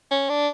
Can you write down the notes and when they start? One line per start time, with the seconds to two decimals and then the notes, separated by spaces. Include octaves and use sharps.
0.11 C#4
0.29 D4